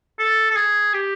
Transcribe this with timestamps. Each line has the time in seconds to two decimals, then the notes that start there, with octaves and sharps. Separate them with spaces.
0.19 A4
0.50 A4
0.56 G#4
0.94 G4